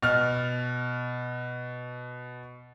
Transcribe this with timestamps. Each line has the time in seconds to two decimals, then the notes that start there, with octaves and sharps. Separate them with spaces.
0.02 B2 F6